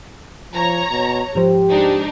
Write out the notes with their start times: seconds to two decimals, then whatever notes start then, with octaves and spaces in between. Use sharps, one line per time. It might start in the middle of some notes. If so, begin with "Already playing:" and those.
0.53 F3 C#5 A#5
0.91 B2
1.35 G#2 F3 G4 C5
1.69 G#3 D4 D#4